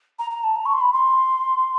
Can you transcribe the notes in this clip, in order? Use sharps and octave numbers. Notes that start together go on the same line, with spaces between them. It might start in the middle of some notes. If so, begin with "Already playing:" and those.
A#5
A#5
A5
A#5
C#6
C6
B5
C6